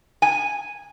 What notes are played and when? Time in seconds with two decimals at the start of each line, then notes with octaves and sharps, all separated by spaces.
0.22 G#5